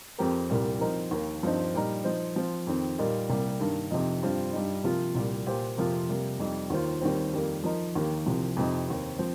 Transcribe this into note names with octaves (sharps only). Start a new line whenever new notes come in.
F2 F3 C4 G4 A#4
C2 A#2 G3 A#3
F3 C4 D#4 A#4
D#2 D#3 A#3
G2 F3 C4 D#4 C5
A#2 G3 D#4 A#4
F3 D#4 C5
F3 C4 F4
F2 D#3 C4
A#2 G3 A#3 D#4
C2 C3 G3 A#3
G2 D#3 A#3
F2 C3 F3 D#4
G2 G3 C4 F4
G2 G3 D#4
C3 F3 A#3 F4
C2 A#2 G3
A#2 A#3 G4 C5
F2 C3 F3 A#3 F4
C3 G3 A#3
F2 C3 G3 D#4
D#2 D#3 A#3 F4 C5
D#2 D#3 G3 C4
F2 D#3 G3 A#3
F3 D#4 A#4
D#2 D#3 A#3 G4
C2 C3 F3
F2 C3 F3 D#4
D#2 D#3 C4
F3 C4